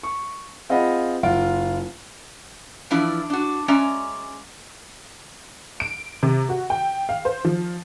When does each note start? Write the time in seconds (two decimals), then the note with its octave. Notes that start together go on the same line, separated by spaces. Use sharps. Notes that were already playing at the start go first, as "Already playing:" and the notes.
0.03 C#6
0.70 C4 F4 G#4 D#5 F#5 B5
1.23 F#1 F4 F#5 D7
2.90 E3 F3 D4 E4
3.30 D4 F#4
3.68 G#3 C#4 D5 E5 A#5
5.80 D7
6.23 C3
6.49 F#4
6.70 G5
7.09 F5
7.25 C5
7.45 F3